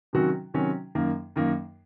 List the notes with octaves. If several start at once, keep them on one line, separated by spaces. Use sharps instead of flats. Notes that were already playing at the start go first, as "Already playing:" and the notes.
C3 D#3 F#3 C#4 F#4
C3 D#3 F#3 C#4 F#4
F#2 D#3 A#3
F#2 D#3 A#3